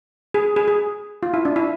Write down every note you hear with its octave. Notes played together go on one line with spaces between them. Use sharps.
G#4
G#4
G#4
F4
E4
D4
E4